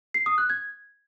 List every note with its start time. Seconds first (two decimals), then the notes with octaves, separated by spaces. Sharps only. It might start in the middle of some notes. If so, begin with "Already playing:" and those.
0.14 C7
0.26 D#6
0.38 F#6
0.50 G#6